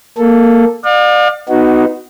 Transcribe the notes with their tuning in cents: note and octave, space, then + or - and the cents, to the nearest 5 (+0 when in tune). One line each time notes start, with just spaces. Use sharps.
A#3 +0 A4 +0
D5 +35 F5 +40
B3 +20 D#4 +0 F#4 +0